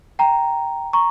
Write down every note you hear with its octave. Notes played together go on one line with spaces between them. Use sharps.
G5 A#5
A#5 C#6